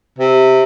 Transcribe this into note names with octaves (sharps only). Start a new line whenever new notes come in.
C3